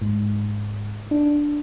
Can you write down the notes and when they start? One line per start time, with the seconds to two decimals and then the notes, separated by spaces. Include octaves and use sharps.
0.02 G#2
1.11 D4